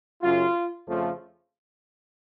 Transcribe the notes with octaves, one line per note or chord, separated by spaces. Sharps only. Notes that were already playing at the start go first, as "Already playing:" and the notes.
F#2 C#3 F#3 F4
F2 C#3 F3 A3 F4